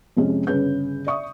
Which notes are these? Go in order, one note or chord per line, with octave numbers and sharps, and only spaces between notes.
F2 C3 G#3 C#4
G1 C#3 C#4 G#4 B4 G6
D5 E5 C#6 D#6